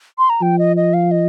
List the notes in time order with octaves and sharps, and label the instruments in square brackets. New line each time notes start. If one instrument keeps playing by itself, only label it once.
[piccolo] C6
A#5
[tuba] F3 [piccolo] G5
[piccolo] D#5
D#5
F5
D#5